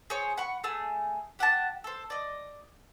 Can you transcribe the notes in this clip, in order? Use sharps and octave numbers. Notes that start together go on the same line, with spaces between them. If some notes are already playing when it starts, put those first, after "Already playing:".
G#4 C5 C#5
F#5 B5 C#6
A3 G#4 A5 E6
G4 F#5 G5 A5
A4 C5
D5 D#5